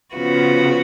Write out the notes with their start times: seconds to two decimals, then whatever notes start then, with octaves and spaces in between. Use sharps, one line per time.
0.15 C#3 F3 B3 F#4